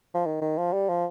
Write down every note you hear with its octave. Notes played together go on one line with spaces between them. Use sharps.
F3
D#3
D#3
F3
G3
F3